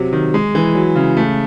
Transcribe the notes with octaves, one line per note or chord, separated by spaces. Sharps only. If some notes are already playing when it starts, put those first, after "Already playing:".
Already playing: C3 F#3
D#3
G#3
E3
F#3
C#3
A3